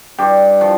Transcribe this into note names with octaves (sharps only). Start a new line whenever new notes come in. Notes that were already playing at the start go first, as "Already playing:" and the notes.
G2 G4
F3